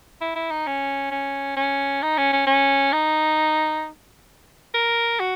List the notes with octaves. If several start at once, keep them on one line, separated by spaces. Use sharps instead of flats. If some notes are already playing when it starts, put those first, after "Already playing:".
E4
E4
D#4
C#4
C#4
C#4
D#4
C#4
C#4
C#4
D#4
A#4
F#4